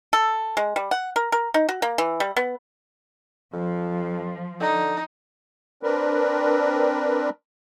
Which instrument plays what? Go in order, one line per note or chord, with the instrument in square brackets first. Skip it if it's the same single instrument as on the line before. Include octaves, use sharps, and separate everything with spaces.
[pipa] A4
G#3
G3
F#5
A#4
A#4
D#4
F#4
A#3
E3
G3
B3
[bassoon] F2 [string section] F3
[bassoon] D3 [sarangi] D#4
[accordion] C4 D4 A#4 B4